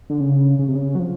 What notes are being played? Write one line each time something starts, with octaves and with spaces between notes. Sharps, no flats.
D3
C#3
C#3
C3
C#3
F#3
F3